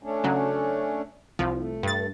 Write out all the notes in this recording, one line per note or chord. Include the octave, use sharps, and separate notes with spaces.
A3 C#4 D4
C#3 F#3
C2 F3
A3
G2 A6